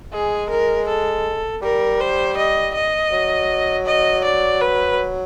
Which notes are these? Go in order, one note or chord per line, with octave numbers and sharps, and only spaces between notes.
G#3 G#4
A#4
A4
G3 A#4
C5
D#5
D#5
F#3
D#5
D5
B4